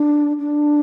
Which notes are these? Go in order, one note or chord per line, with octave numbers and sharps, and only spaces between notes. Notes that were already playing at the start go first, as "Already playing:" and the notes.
Already playing: D4
D4